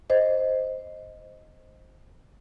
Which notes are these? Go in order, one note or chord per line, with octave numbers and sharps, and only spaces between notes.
C5 D#5